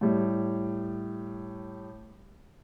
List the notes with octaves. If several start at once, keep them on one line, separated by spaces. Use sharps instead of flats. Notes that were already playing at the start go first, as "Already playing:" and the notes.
A2 G3